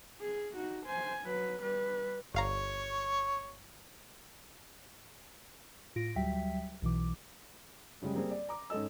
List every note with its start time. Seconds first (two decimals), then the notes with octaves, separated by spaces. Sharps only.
0.21 G#4
0.56 D#4 F#4
0.87 C5 G#5
1.24 F#3 B4
1.62 G3 B4
2.34 G1 C#5 F5 A#5 C#6
5.96 A2 F4 A#6 D7
6.16 D2 F#3 G3 E5 G5 B6
6.82 B1 B2 E3 D6
8.01 F#2 C#3 G3 G#3
8.15 G3 A#3 C4 G#4
8.31 D5
8.49 A#5 D6
8.70 G#2 C#4 A4 D#5 E6